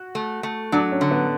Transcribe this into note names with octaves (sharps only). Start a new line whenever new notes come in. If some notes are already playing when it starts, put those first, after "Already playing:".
Already playing: F#4
A3
A3
F#3 D4
C#4
D3
B3